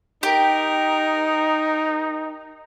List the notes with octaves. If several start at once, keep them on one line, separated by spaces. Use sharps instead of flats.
D#4 G4 A#4